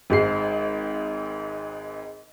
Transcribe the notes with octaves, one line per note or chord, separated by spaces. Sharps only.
G#1 G#2 C7